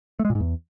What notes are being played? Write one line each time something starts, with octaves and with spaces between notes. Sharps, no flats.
A3
G#3
A#2
G#2
E2